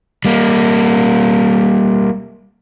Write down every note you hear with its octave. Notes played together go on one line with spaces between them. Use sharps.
G3 A#3